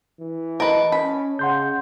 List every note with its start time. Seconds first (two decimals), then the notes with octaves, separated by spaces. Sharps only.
0.20 E3
0.60 A#4 B4 D#5 A5
0.92 C#4 B5
1.39 C#3 F#5 C6 G6